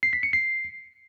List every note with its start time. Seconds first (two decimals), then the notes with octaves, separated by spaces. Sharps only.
0.03 C7
0.13 B6
0.23 C#7
0.33 C7